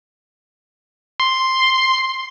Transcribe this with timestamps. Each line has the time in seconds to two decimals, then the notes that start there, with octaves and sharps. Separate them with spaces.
1.20 C6